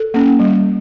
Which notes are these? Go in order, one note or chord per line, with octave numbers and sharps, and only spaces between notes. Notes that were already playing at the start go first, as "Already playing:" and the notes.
Already playing: A4
A#3 C#4
G3